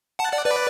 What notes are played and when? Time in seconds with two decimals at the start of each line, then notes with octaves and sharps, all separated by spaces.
0.19 F#5 A5
0.33 D5 F#5
0.45 B4 D5